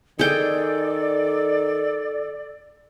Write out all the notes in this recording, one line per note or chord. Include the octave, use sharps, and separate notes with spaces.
D#3 G#4 A4 D5 G5